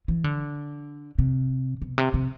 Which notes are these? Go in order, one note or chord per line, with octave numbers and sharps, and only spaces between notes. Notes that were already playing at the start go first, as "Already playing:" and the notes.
E3
D3
C3
B2
C3
C3